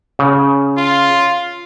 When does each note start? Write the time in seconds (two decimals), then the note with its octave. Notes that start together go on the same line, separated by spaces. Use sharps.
0.19 C#3
0.78 F4